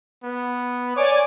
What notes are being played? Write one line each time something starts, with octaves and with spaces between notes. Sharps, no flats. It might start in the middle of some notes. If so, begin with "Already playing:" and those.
B3
C#5 D5 G#5 D6